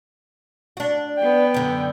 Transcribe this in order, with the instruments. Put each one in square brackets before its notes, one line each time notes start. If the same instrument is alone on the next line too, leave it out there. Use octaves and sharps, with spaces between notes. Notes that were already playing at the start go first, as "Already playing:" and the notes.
[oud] D4 F#4
[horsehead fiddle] B3 G5
[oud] F#2 D3